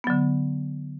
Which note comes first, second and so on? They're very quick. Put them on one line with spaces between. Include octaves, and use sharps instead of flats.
B3 F#3 D3